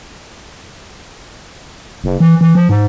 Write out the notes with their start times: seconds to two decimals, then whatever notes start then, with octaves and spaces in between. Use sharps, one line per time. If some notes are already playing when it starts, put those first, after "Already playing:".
2.04 F#1
2.20 E3
2.41 E3
2.55 F3
2.69 G#2